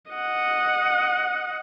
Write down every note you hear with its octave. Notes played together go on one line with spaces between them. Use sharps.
D#5 F#5